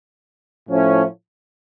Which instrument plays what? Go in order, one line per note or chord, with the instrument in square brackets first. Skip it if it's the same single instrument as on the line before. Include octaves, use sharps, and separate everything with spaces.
[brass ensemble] A2 F3 C#4 E4